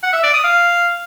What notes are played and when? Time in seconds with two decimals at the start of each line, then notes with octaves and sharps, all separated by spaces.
0.03 F#5
0.13 E5
0.23 D5
0.34 D#6
0.44 F5